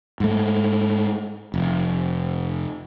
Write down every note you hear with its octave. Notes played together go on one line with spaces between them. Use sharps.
G#2 A3
F1